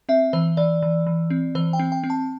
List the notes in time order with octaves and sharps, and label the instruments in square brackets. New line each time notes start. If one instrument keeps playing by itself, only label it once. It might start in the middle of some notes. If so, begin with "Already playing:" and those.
[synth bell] C4 E5
E3 C5
E3 D5
E3
E3
C4
E3 C5
G5
C4
G5
C4
A5